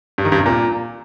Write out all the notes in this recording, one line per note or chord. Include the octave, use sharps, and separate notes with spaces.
G2
D#3
G2
C3
A#2